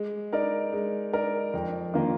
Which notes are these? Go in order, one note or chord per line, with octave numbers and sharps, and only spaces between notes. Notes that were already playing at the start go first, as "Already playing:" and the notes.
Already playing: G#3
D#4 A#4 D5
G#3
D#4 A#4 D5
F2
D#3 A#3 F4 A#4